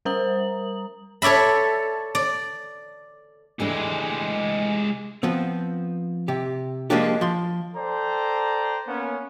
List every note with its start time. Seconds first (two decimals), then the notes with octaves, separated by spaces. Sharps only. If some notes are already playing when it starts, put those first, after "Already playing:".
0.05 G3 A#4 C5 A#5 D#6 F#7
1.22 A4 C#5 D5 E5 B5
2.15 D5
3.60 E3 G#3 A3 D4 G4
5.23 F3 B3 C4
6.28 C3 G4
6.90 F3 G#3 A#3 C#4 D4 G4
7.21 F3 C6
7.76 A4 C5 D5 G5 A#5
8.88 A#3 B3 C#4